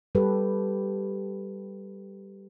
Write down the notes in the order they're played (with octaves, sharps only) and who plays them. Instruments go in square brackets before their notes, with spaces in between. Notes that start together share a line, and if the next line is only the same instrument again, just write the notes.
[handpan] G3 G4 A4 B4